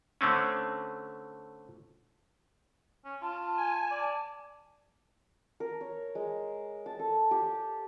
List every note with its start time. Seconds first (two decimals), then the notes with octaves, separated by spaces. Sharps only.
0.21 D3 A3 C4 C#4
3.05 C#4
3.22 F4 A5
3.57 G#5
3.91 D5
5.60 A#4
5.81 C#5
6.15 G#3
6.86 A5
6.99 A4
7.31 G4